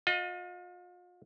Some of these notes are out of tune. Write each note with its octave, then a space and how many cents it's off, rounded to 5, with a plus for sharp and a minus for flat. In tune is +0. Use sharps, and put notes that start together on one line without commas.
F4 +40 D#5 +5